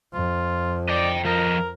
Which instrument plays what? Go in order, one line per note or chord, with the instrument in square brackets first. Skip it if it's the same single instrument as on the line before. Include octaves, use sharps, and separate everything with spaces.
[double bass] F2 [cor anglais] F4
[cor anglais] D5 [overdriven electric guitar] D#5 G5
[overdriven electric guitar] F3 D#5 [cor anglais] A#4